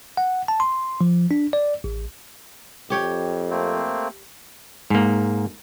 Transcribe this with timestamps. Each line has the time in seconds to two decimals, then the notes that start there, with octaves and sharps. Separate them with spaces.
0.17 F#5
0.48 A5
0.60 C6
1.01 F3
1.31 D4
1.53 D5
1.84 A1
2.90 F2 G4 C#5 G5
3.50 A3 A#3 C4
4.90 G#2 A#3